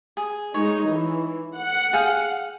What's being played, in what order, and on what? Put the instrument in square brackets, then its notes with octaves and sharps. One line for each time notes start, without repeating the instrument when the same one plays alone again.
[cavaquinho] G#4
[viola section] G#3 D#4 [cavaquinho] C#5
[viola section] E3
F#5
[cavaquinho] G#4 F5 G5